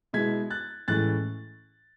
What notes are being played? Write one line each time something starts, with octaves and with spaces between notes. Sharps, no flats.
B2 G#3 B3 E4 G#6 B6
F#6 A6
A2 E3 G#3 C#4 F#6 A6